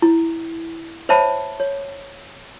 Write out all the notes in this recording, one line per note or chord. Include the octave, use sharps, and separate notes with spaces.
E4
C5 C#5 E5 A5 B5
C#5